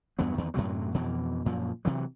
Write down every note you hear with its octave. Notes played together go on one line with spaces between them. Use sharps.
E2 G2 F#3 B3
E2 D#3
F#2 A2 C3 F#3
F2 B2 E3
F#2 A#2 F3
C3 E3 F#3